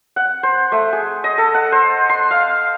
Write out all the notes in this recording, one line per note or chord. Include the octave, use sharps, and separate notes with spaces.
F#5
C5
A3
G#4
D#5
A4
F#5
C5
C6
F5